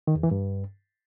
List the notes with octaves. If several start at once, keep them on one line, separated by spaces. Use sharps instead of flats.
D#3
E2
E3
G2